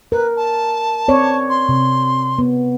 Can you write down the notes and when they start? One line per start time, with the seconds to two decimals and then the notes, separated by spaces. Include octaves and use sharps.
0.12 A#4 B4
0.36 A5
1.08 C4 C#5 D5
1.50 C6
1.69 C3
2.38 B3